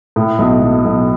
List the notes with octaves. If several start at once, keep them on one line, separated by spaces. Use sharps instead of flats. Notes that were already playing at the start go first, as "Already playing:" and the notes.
A2
B1
B1
B1